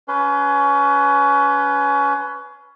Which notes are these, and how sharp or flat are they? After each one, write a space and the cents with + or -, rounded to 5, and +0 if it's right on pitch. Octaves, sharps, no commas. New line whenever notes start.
C#4 +25 B4 +5 C6 -20